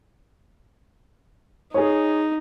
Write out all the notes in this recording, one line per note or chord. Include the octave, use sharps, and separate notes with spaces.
D#4 G#4 C#5